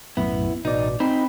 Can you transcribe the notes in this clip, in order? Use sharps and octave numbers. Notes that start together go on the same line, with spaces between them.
B1 F#2 A2 B3 E4
A1 B2 D#4 D5
C4 D#4 B5